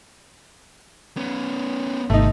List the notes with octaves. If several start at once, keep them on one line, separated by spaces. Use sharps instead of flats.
B3 C#4
G#1 C3 A3 D#4